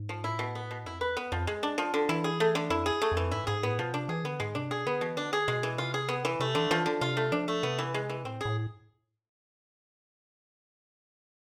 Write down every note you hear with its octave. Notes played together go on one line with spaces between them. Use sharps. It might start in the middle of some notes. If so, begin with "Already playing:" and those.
Already playing: G#2
F3
A2 E4
B2
B3
B2
F2 E4
E2 B4
B3
F2 F3
G#3
D4
F3
D3
E3 E4
G#4
A3
D3
F2 E4
G#4
A3
F2
E3
G#2 E4
G#2 G#4
A2 B3
B2 F3
C3 D4
E3 G#4
D3 B3
G#2 G#3
C3 D4
B2 G#4
D3 B3
B2 E3
D3 D4
G#4
B2 G#3
E3
C3 F4
G#4
B3
E3
C3 A3
D3 E3
E3 F3
D3
C3 F4
A3
F3 D4
A3
C3 B3
E3
G#3
E3
A2 C4
A2 G#4